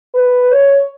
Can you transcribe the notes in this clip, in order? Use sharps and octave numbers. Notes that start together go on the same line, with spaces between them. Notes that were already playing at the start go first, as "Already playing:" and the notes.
B4
C#5